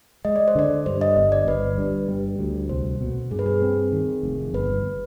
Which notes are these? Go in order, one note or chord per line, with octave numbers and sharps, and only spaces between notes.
G#3 D#5
D5
C5
D3 D5
G2 C5
D#5
G1 D#5
D5
G1 B4
G2
G3
D2
C2 C5
B2
G2 G#4
B4
G#4
C4
D#3
F1
G1 B4